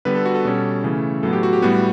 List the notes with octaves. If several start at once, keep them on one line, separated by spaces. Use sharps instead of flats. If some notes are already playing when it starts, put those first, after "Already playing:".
D3 G3 B3 B4
A4
F#4
A4
B2 G3 C#4
C#3 E3 A3 C#4
A2 F#3 B3 A4
G4
F#4
G4
A2 G3 B3 F#4